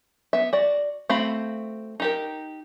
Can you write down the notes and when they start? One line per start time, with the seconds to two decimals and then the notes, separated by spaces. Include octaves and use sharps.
0.33 B3 E5
0.53 F#4 D5
1.09 A3 C4 F#4 F5 B5
2.00 D#4 G4 A#4